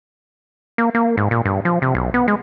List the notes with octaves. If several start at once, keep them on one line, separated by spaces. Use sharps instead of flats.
A#3
A#3
G#2
A#2
G2
F3
C3
B1
B3
G#3